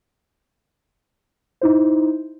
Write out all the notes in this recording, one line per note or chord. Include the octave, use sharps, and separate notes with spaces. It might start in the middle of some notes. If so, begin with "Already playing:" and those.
D#4 E4 C5